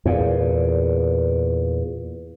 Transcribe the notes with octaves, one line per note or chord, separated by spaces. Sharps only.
E2 A#2